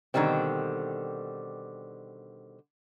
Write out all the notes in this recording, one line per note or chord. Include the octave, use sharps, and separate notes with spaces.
B2 D3 D#3 G3 C4